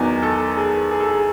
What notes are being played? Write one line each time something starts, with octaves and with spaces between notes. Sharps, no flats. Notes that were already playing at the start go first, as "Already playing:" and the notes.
Already playing: E2 D#3 F#3 B3 D#4 G#5
A4
G#4
G#4
A4
G#4